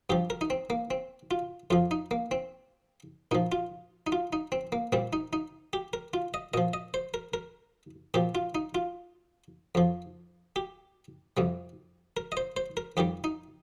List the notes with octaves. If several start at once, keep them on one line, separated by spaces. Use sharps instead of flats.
G2 F3 G4
A#4
D#4
C4
A#3
C4
F4
F2 F3 F4
D#4
A#3
C4
A#2 F3 D#4
F4
D#4
F4
D#4
C4
A#3
A#2 G3 C4
D#4
D#4
G4
A#4
F4
D#5
A#2 F3 D#5
D#5
C5
A#4
A#4
A#2 F3 G4
F4
D#4
F4
F2 F3
G4
F2 C3 G3
A#4
D#5
C5
C5
A#4
F2 D#3 G3 G4
D#4